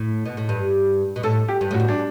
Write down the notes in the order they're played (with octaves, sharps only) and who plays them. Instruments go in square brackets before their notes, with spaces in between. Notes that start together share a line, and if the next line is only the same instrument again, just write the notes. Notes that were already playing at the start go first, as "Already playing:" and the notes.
Already playing: [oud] A2
B2
A2
G2
B2
[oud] A2 [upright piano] A4
[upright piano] G4
[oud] G2
[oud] A2 [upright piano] F#4
[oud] G2
[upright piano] D4